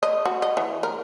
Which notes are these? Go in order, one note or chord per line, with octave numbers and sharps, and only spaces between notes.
D#5
F#4
D#5
E3
A#4